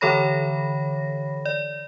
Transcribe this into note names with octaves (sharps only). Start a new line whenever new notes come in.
D3 E3 A4 C#5 B5 A#6
D5